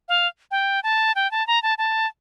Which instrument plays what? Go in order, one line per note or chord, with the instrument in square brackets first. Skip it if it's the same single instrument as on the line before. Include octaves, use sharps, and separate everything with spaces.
[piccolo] F5
G5
A5
G5
A5
A#5
A5
A5